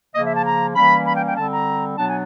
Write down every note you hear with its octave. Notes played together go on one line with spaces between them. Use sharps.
C#3 F3 A#3 D#5
E5
A5
A#5
E3 G3 A#3 C#4 B5
B5
G5
G5
D3 G3 C4 A5
A#5
B2 F#3 B3 D4 A5
G#5